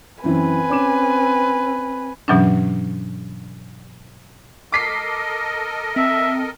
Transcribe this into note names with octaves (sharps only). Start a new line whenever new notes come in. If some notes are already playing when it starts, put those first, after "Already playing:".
F#2 E3 C4 B4 G#5
C#4 D6 E7
G2 B2 E3 F#3 C#4 D4
A4 A#4 D#5 D6 B6 C7
C4 E5